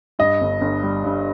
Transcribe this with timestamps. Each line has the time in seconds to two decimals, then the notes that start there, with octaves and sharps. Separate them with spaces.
0.19 G2 D#5
0.41 G1
0.61 G1
0.83 G3
1.04 G2